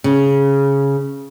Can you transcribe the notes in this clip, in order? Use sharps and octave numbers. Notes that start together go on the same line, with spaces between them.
C#3